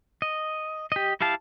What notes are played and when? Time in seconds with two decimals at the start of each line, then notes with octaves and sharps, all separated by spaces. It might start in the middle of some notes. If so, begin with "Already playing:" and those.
0.22 D#5
0.92 G4 D#5
1.21 E4 G4 F5 A5